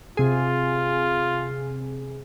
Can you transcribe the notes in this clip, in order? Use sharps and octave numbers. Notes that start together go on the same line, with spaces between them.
C3 F4 G#4